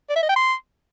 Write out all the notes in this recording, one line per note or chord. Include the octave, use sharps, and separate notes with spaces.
D5
E5
D#5
G5
C6